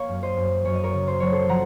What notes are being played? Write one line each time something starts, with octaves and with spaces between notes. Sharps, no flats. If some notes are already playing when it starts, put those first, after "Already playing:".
Already playing: A#3 C#5 F5
F#2
C5 D#5
F#2
F#2 C#5
D#5
A#4 C#5
C#3
C5
F#3 C#5
A4 C5
F3 F#5 A#5